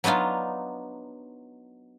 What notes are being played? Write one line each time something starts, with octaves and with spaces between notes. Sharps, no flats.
F#3 B3 D4 D#4 F4